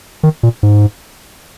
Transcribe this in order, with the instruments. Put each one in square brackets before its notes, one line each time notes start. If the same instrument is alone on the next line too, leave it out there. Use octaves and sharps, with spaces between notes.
[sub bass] D#3
A#2
G#2